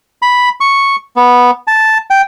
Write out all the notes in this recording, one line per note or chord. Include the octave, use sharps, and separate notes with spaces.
B5
C#6
B3
A5
G5